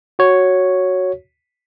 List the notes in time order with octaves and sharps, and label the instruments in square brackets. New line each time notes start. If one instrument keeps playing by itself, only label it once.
[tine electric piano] F#4 C#5